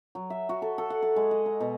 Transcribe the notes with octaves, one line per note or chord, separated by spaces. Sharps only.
F#3
E5
F#4
A4
A4
F#5
A5
G#3
D#5
A#5
B2